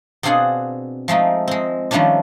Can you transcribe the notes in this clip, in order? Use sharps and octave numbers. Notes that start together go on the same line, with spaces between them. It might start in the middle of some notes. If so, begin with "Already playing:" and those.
B2 C4 D4 F4 G#4 F#5
F3 G#3 A3 D#4
G#3 C4
D#3 F3 G3 A3 C#4 D4